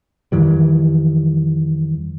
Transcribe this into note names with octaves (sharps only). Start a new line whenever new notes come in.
F2 D#3 E3 G3